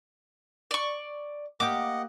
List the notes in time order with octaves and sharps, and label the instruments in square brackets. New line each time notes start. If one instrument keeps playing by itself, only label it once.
[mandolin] D5 C#6
[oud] A#3 G4 [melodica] D#5 F#5 [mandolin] D6